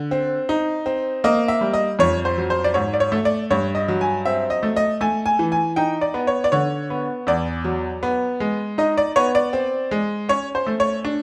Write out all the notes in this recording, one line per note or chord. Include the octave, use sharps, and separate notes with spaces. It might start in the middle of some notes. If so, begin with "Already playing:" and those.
Already playing: D3
C4
D#4
C4
A#3 D#5
E5
G3
D#5
F2 C#5
C5
F#3
C5
D5
G#2 C#5
D5
C#5
A3
D5
G2 C#5
D#5
F#3
G#5
C4 E5
D#5
A3
D#5
A3 G#5
G#5
E3
G#5
D#4 G5
D5
B3
C#5
D5
D3 C#5
B3
E2 D5
F#3
B3
G#3
D#4 D#5
D5
B3 C#5
D5
C4
G#3
C#4 C#5
C5
A3
C#5
D4